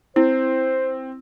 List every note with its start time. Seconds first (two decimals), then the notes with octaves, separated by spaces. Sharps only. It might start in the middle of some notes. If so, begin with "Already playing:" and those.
0.16 C4 E4 C5